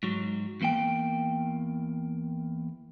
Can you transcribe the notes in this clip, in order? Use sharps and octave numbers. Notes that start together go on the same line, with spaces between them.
G#2 F#3
E2 A#3 G5